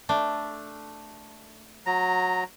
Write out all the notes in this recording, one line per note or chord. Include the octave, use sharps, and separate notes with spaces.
A3 D4
F#3 A#5